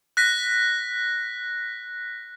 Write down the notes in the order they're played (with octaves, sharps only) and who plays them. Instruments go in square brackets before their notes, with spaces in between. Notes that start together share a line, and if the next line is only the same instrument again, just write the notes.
[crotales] F#6 A#6 B6